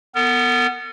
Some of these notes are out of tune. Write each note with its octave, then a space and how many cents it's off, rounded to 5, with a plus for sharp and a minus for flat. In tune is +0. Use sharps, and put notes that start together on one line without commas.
B3 +0 A#4 -45